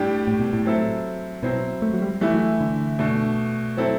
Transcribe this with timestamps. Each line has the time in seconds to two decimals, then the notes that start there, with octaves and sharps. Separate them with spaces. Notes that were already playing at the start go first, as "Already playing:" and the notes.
Already playing: A2 G3 D4 G4
0.27 A2
0.40 B2
0.53 A2
0.65 F#3 C4 E4 A4
1.43 B2 F#3 C4 E4
1.82 A3
1.94 F#3
2.02 G3
2.21 E3 G3 A3 E4
2.34 F#3
2.61 D3
2.99 B2 A3 D4
3.77 F#3 C4 E4 A4